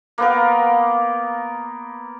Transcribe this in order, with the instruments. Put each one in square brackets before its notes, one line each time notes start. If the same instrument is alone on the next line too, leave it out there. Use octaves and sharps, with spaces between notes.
[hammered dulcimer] A#3 B3 A#4